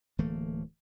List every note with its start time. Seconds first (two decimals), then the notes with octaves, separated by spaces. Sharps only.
0.18 D1 E3 A3 A#3